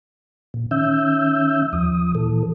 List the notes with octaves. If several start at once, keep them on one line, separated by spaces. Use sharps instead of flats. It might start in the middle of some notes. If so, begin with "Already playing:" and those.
A#2
D#3 C#4 E5 E6 G6
D#2 F3 D#6
A#2 E3 A4